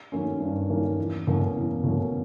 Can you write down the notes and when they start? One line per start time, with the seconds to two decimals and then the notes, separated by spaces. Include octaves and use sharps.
0.12 D#3 F#3 A#3 C#4
0.40 G2
0.69 D#3 F#3 A#3 C#4
0.99 E2
1.27 B2 F#3 A#3 C#4
1.56 E2
1.83 B2 F#3 A#3 C#4